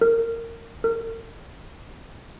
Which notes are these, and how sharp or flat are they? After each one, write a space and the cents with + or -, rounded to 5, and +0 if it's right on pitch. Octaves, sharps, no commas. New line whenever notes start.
A#4 -20
A#4 -35